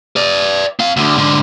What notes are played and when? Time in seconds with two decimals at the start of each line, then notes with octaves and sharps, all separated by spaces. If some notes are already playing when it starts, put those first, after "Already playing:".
0.16 B4 D5
0.79 C4 F5
0.97 D2 D3
1.18 G#2 D3